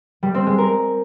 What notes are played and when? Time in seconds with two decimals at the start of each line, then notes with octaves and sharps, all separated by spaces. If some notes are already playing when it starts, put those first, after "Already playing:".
0.23 G3
0.35 C4
0.46 G#3
0.58 A#4